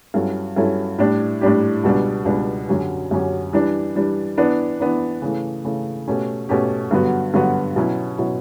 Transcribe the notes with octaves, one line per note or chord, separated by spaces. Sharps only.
G2 F#3 C#4 E4 A4
G2 F#3 C#4 E4 A4
A2 G3 D4 G4
A2 G3 D4 G4
C#2 B2 G3 D4
C#2 B2 G3 D4
F#2 D3 F#3 C#4 G4
F#2 D3 F#3 C#4 G4
E3 G3 D4
E3 G3 D4
E3 B3 D4
E3 B3 D4
C#3 E3 A3
C#3 E3 A3
B2 A3 C#4 G4
B2 A3 C#4 G4
G2 D3 F#3 B3 F#4
G2 D3 F#3 B3 F#4
B2 F#3 C#4 E4
B2 F#3 C#4 E4